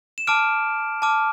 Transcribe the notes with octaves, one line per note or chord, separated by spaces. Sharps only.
E7
A5 D6 F6 D7
A5 D6 F6